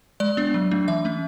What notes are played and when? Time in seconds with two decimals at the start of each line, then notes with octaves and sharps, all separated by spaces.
0.20 G#3 D5
0.37 B3 D4
0.54 F#3
0.71 A3 D4
0.88 E3 E5
1.05 A3 C#4